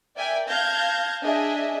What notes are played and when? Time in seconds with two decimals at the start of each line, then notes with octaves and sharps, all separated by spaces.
0.17 A#4 D5 E5 G5 G#5
0.48 F5 A5 G6 G#6 A#6
1.24 D4 G#4 D#5 E5